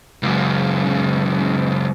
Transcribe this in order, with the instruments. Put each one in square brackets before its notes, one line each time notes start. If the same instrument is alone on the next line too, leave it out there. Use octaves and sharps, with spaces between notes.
[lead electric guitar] C#2 F#2